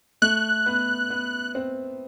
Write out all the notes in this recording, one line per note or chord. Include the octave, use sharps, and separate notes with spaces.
A3 F#6
B3
B3
C4